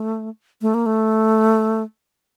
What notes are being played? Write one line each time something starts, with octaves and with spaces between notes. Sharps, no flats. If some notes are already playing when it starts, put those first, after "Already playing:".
Already playing: A3
A3
A#3
A3